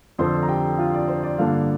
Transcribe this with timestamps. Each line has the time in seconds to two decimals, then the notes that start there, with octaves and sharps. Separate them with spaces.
0.19 F2 D3 F3 D4 C5 C6
0.43 A#5
0.49 G4 G5
0.78 F4 F5
0.94 D5
1.08 C5
1.23 D5
1.38 G2 D3 A#3 D4 F4 F5